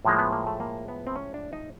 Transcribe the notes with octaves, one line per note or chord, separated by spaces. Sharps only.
A2 F3 G#3 A#3
B3
A#3
A3
A#3
B3
C4
C#4
D4
D#4